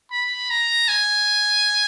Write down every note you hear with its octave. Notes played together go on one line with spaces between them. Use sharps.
B5
A#5
G#5